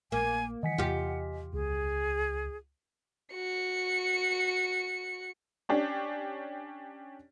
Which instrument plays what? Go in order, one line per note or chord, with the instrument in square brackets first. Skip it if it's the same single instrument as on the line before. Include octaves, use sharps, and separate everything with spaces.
[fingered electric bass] A#1 [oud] A#3 [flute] G#5
[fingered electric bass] D#3 E3 G3 [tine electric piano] D#5 G#5 B6 [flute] F#5
[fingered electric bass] E2 C3 [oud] F4 G4
[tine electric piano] C#2 [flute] G#4
[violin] F#4 C#7
[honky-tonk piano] C#4 D4 G4